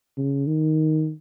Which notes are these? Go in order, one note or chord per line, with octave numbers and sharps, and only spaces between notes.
C#3
D#3